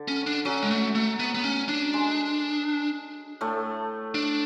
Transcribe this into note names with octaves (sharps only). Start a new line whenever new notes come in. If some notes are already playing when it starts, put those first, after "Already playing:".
Already playing: D3
C#4
D4
F#3 C#4
G#3
A3
A3
B3
B3
C#4
D4
G#3
A2 A3
D4